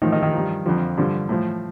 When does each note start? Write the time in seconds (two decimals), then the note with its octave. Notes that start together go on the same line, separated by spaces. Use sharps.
0.02 A2 D#3 F3 D#4
0.12 D#3 D#4
0.22 D#3 D#4
0.34 G2 F3
0.66 F2 D3 F3
0.98 G2 D3 F3
1.29 A2 F3